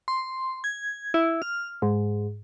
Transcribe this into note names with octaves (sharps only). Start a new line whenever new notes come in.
C6
G#6
E4
F6
G#2